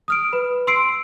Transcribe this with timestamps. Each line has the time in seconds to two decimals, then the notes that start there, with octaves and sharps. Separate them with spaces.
0.08 D#6 F6 D7
0.32 B4 B5
0.67 C6 E6 C7 D7